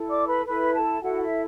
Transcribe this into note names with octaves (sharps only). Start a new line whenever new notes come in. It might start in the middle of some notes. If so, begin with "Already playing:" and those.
Already playing: E4 A4
D5 D6
B4 B5
E4 A4 B4 B5
A4 A5
E4 F#4 A4 F#5
E5